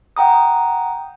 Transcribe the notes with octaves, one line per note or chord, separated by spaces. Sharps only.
F#5 G5 A#5 D#6